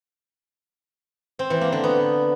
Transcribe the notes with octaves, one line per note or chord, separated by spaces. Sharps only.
C4
E3
A#3
D3
B3